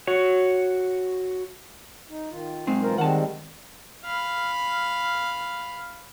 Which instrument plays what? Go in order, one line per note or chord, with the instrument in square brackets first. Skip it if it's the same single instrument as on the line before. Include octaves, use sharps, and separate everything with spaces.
[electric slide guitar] F#4 C#5
[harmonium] D#4
D#3 F4
[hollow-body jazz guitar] B1 G#3 C4
[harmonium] E3 F4 C5 [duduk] A#4
[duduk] D#3 [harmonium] G3 G#3 C4 [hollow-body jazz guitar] F#5 A5
[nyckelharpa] F5 B5